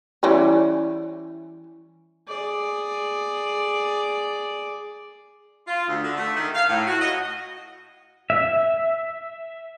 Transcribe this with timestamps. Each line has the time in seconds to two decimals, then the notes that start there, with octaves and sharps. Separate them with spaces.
0.23 E3 G3 C#4
2.28 G#4 D5
5.67 F4
5.88 D2
6.03 D3
6.17 A3
6.35 D#3
6.54 F5
6.67 A2
6.87 F#4
7.00 D#5
8.30 E5